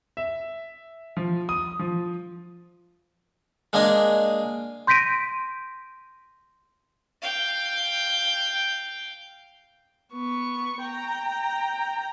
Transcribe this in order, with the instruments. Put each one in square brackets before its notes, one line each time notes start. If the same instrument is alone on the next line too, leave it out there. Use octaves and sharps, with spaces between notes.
[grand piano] E5
F3
D#6
F3
[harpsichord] G#3 A#3 D4 D#5 G#5
[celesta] C6 G6 A#6 B6 D7 D#7
[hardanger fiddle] F5 G5
[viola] B3 C#6
G5 A#5